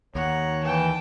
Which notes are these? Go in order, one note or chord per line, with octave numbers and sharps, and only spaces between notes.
D#2 C#5 F#5 A#5
E3 G5 A5